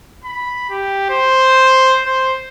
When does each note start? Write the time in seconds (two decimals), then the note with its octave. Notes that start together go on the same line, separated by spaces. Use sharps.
0.25 B5
0.70 G4
1.10 C5
2.05 C5